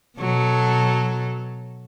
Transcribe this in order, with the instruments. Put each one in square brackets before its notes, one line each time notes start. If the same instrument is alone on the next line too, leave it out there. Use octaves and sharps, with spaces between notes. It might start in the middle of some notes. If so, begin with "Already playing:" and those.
[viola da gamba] B2 F#3 A4